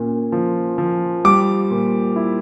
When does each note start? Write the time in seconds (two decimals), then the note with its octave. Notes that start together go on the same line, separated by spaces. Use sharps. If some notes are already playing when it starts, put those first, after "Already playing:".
Already playing: A#2 C#4
0.32 F3
0.78 F3
1.25 G3 D6
1.71 A#2
2.16 E4